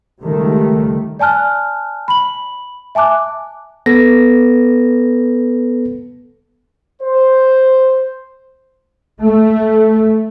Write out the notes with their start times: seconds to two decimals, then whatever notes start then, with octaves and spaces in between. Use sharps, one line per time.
0.23 C#2 D#3 G3 A3
1.19 D5 G#5 A5 F6 F#6
2.08 B5 F#7
2.95 E5 G#5 A5 D6 F#6
3.86 B3 A4 B4 A#6
7.02 C5
9.21 A3